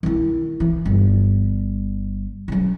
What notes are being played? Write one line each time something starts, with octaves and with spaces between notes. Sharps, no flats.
D#3 E4
E3
G1 G3
C#3 F#3